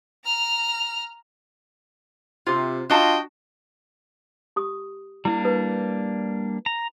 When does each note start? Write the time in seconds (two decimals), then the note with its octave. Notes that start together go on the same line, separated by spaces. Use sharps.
0.25 A#5 F6
2.47 C3 F4
2.90 D4 F4 F#4 D#5 G5 A5
4.56 G4 D#6
5.25 G3 A#3 D4 E4
5.45 B4
6.66 A#5